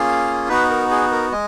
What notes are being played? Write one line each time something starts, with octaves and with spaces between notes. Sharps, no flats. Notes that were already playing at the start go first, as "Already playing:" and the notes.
Already playing: A#3 C#4 F4 G#4 F5
B3 D#4 F#4 B4
A#4
G#4
A#4
G#3 D#5